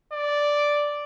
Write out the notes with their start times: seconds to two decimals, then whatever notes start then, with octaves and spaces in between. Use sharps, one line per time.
0.13 D5